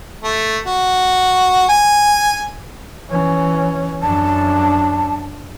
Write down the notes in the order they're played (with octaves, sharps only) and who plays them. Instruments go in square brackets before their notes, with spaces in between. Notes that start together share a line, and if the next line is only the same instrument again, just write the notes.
[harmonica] A3
F#4
G#5
[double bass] E3 C#4
[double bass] F#2 D4 [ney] A5